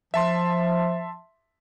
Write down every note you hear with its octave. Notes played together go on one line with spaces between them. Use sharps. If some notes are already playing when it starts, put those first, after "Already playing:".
F3 E5 A5 C6